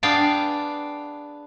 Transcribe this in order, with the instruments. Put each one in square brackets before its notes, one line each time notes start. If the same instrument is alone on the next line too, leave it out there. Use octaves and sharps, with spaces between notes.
[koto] B3 D4 G#4 D5 F5 G5